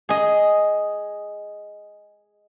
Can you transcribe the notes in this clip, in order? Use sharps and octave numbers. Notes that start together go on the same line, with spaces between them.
G#4 D#5